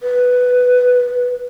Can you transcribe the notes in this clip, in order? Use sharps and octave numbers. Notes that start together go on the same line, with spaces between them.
B4